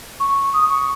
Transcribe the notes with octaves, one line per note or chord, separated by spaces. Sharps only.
C#6
D#6
C#6